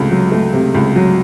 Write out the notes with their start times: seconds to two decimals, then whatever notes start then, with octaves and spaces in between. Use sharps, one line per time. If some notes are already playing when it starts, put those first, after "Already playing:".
Already playing: C#2 C3 A3
0.11 F#3
0.32 A3
0.53 C3
0.75 C#2
0.96 F#3